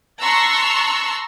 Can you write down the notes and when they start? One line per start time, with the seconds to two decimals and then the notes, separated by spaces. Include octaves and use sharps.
0.20 A5 A#5 C6 C#6 E6 F#6